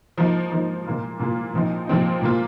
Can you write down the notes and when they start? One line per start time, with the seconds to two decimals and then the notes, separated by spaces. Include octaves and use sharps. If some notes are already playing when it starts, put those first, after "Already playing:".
0.18 F3 A#3 D#4
0.51 F3 A#3 D#4
0.85 A#2 A#3 F4
1.19 A#2 A#3 F4
1.53 A#2 F3 C4 D#4
1.87 A#2 F3 C4 D#4
2.22 A#2 A#3 F4